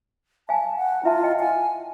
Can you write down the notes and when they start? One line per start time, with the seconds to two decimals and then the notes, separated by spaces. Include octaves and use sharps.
0.49 F5 G#5 A5
0.76 F#5
1.04 E4 F4 E5 A5
1.23 D#5 G5
1.40 F#5 G#5